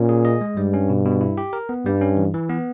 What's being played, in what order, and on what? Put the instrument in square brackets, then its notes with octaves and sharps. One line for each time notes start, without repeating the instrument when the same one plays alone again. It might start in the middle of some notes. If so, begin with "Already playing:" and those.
Already playing: [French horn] A#2 [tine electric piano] C#4
[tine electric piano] G#4
D#5
G#3
[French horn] G2 [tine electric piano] G3
[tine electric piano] C#4
B2
B2
E4
G4
A#4
B3
[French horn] G2 [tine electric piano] G3
[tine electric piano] C#4
E3
E3
B3